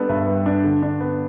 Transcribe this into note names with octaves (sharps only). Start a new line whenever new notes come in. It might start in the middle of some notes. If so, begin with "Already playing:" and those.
Already playing: G3 B3 D4 A4 D5
G2 B4 E5
G3
D4
D3
D4
B3